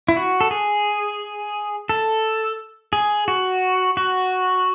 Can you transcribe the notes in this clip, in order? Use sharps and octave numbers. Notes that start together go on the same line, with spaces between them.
E4
F#4
A4
G#4
A4
G#4
F#4
F#4